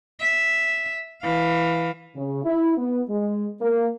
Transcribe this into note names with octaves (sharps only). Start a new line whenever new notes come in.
E5
E3 F5
C#3
E4
B3
G#3
A#3